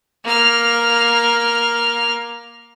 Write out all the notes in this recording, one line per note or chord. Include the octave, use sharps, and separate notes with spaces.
A#3 F6